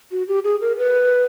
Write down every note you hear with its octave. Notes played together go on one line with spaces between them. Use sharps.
F#4
G4
G#4
A#4
B4